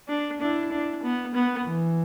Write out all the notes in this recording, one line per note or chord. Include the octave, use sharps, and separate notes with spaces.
D4
D4 E4
D4
B3
B3
E3